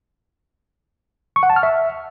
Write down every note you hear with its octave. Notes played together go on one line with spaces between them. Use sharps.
C#6
F#5
A5
F6
E5